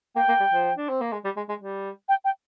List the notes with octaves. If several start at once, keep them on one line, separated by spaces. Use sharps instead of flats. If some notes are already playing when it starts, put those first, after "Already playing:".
A#3 G5
A#3
G3
F3
D4
C4
A#3
G#3
G3
G#3
G#3
G3
G5
G5